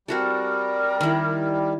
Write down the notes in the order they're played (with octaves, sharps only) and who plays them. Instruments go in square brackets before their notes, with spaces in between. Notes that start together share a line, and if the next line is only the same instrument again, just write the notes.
[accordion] G3 [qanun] C4 F#4 A4 [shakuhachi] A#4
[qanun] D#3 E4